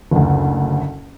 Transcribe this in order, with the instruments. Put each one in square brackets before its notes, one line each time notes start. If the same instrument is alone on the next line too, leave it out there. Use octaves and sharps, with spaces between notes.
[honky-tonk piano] F#1 D2